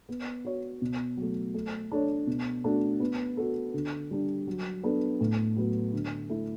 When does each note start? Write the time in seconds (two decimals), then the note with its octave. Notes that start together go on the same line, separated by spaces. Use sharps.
0.09 B3
0.45 F#4 C#5
0.82 B2
1.17 F#3 A3
1.54 A3
1.92 D4 A4 C#5
2.27 B2
2.64 A3 D4 F#4
3.00 B3
3.37 F#4 A4
3.74 D3
4.11 G3 D4
4.47 F#3
4.84 B3 D4 A4
5.21 A2
5.56 F#3 B3 F#4
5.93 D3
6.30 A3 E4